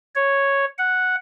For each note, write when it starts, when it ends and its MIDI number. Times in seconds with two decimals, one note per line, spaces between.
0.15 0.65 73
0.78 1.15 78